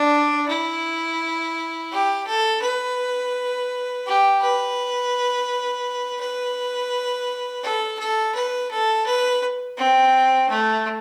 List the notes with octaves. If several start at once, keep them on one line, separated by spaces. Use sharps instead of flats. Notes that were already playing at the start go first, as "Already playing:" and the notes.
Already playing: D4
E4
G4
A4
B4
G4
B4
B4
A4
A4
B4
A4
B4
C4
A3